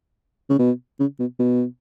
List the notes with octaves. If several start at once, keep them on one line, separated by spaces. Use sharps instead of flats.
C#3
B2
C#3
B2
B2